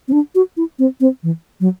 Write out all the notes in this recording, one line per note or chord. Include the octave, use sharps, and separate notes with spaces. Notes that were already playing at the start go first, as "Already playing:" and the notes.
C4
D4
F#4
E4
C4
C4
E3
F#3